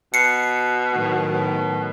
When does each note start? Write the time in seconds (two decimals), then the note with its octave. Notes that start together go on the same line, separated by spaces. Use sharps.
0.14 B2 C7 C#7
0.94 A2 D#3 F#3
1.32 B2